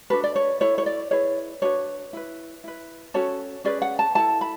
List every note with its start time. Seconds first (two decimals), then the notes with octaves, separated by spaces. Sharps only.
0.10 D4 F#4 A4 B4
0.24 D5
0.36 C#5
0.61 E4 A4 C#5
0.78 C#5
0.86 D5
1.11 E4 G#4 B4 C#5
1.62 D4 F#4 B4 C#5
2.13 E4 B4
2.64 E4 B4
3.14 C#4 F#4 A4 C#5
3.65 C#4 G#4 B4 D5
3.82 F#5
3.99 A5
4.15 E4 A4 A5
4.41 B5